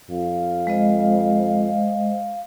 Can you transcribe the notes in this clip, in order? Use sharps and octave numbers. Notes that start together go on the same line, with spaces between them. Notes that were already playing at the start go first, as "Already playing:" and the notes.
F2 F5
G#3 C5 D#5